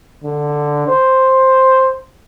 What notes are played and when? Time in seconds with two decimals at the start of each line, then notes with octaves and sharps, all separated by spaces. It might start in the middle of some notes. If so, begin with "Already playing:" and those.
0.23 D3
0.88 C5